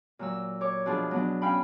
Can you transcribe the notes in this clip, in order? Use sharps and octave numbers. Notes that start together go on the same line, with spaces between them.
A#2 F#3 E6
C#5 D6
B2 F3 D4 F4 G#4
F#3 B3 D4
C#4 F5 G5 B5